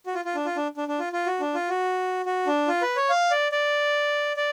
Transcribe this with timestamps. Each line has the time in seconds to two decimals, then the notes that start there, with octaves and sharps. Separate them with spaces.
0.06 F#4
0.15 F4
0.25 F4
0.35 D4
0.46 F4
0.57 D4
0.77 D4
0.88 D4
0.99 F4
1.13 F4
1.27 F#4
1.40 D4
1.55 F4
1.69 F#4
2.26 F#4
2.47 D4
2.68 F4
2.82 B4
2.96 C#5
3.10 F5
3.31 D5
3.52 D5
4.37 D5